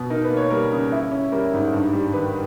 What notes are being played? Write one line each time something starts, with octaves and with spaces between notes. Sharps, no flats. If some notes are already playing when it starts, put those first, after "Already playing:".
Already playing: B2
D#4 A#4
B4
A#3
C#5
G3 A#4
C#3
E4
C#4
G3 A#4
G#2
G2
G3
D#3 B4